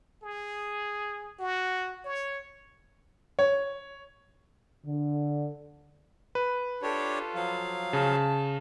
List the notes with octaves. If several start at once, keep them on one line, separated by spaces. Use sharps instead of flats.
G#4
F#4
C#5
C#5
D3
B4
D4 F4 G4 A4 C#5
F3 F#3 F5
C#3 A5